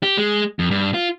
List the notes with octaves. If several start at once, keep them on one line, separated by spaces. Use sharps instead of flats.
G4
G#3
F2
G2
F4